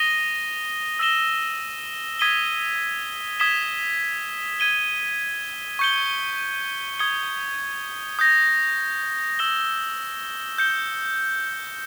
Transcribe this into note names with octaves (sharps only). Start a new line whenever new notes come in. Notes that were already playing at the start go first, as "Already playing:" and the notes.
Already playing: D#6 A#6 D#7 G7
E6 A#6 E7 G7
D#6 G#6 B6 D#7 G7
D#6 G#6 B6 E7 G7
G#6 D#7 G7
C#6 G6 C#7 G7
D#6 G#6 C#7 G7
D#6 G6 A#6
E6 A#6 E7 G7
G6 C#7 G7